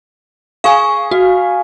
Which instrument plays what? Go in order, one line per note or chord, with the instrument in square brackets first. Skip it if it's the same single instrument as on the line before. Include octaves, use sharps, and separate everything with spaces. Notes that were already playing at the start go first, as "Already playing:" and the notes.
[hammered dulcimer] G#4 C#6 [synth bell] F5 G#5
[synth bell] F#4 [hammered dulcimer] F5